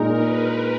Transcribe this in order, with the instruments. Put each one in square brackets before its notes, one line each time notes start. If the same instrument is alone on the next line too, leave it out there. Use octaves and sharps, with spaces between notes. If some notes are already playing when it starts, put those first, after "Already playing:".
Already playing: [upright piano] A#2 G#3 D#4 [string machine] A#4
[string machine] B4